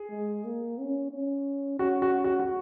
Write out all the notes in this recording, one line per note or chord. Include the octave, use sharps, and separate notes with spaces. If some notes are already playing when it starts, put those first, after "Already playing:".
Already playing: G#4
G#3
A#3
C#4
C#4
C#4 F#4
F#4
F#4
F#4